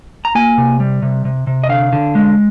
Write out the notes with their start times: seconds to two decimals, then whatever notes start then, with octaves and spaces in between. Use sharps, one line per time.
0.25 A#5
0.35 A#3 G#5
0.58 C3
0.80 G3
1.02 C3
1.25 C3
1.47 C3
1.64 D#5
1.69 D3 F5
1.93 D3
2.15 G#3